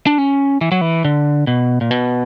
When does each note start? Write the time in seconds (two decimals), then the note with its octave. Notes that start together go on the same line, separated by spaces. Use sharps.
0.07 D4
0.18 C#4
0.61 E3
0.72 F#3
0.81 E3
1.05 D3
1.47 B2
1.81 A#2
1.91 B2